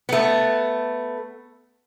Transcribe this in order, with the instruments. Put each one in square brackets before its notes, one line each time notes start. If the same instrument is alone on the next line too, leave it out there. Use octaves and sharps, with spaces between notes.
[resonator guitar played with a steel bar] A3 B3